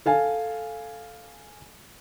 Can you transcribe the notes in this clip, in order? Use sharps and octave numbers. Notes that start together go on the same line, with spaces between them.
A4 F5 G#5